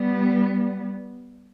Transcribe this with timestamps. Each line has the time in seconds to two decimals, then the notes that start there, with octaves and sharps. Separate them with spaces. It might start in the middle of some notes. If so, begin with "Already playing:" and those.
Already playing: G3 B3